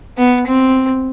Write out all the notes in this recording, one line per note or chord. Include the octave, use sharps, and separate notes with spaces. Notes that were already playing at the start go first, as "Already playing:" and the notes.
B3
C4